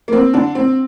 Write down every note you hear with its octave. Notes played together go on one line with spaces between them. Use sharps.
A#3
C4
D3 D4
C4